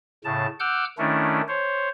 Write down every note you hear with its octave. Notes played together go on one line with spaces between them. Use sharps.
A2 C#3 A5
F#5 D6 E6 F6 G6
D#3 A3 C#4 D4 E4
C5 C#5